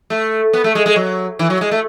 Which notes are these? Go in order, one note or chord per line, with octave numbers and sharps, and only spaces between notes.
A3
B3
A3
G#3
G#3
F#3
E3
F#3
G#3
A3